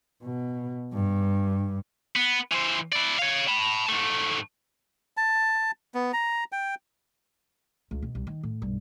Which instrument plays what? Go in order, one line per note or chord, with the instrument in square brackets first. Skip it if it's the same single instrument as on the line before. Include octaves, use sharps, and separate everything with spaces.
[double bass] B2
G2
[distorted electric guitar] B3
E3 C5
E4 D5
C#5 F5
A5 B5
G#2 A3
[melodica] A5
B3
A#5
G5
[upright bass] C#2
B2
C2
D#3
A2
B1 G2